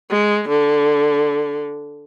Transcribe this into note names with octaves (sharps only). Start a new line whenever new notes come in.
G#3
D3